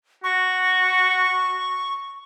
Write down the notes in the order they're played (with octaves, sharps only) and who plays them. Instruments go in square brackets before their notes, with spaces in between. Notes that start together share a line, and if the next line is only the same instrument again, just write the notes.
[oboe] F#4 [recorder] C#6